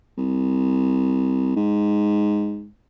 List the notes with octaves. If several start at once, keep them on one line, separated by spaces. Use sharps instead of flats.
C2
G#2